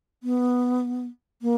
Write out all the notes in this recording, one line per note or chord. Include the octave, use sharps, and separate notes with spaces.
B3
A#3